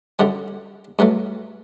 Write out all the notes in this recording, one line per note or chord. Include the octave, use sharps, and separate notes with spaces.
F#2 D3 G3 F#5
G2 F#3 A3 F#5